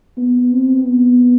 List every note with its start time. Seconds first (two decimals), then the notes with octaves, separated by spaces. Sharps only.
0.17 B3
0.52 C4
0.85 B3